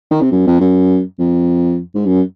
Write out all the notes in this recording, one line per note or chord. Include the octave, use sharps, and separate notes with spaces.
D#3
C3
F#2
F2
F#2
F2
G#2
F#2